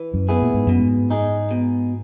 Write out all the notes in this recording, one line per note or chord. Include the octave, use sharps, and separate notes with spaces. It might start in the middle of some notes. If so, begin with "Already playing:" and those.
Already playing: E3
F#2
B3 E4 G#4
A#2
G#2
F#2 B2
G#2
G#3 D#4 G#4
B2